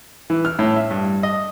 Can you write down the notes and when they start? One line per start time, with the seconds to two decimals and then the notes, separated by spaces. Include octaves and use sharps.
0.30 E3
0.45 F6
0.59 A2
0.76 E5
0.91 G2
1.23 D#5